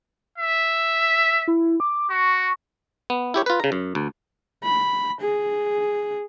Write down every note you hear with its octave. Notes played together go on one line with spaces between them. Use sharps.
E5
E4
D6
F#4 C#6
B3
E4 G4 C#5
F4 B4
C#3 A#5
F#2
D2
B5
G#4